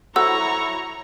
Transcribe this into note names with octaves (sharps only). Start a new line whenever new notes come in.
F#3 E4 F#4 A4 C5 A#5 C#6 E6